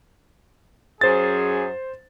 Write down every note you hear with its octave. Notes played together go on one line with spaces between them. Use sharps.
F#2 G#4 C5 A6